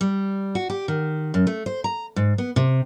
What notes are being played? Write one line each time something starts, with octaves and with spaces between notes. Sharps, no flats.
G3
F#4
G4
D#3
F#2
A3
C5
A#5
G#2
B3
C3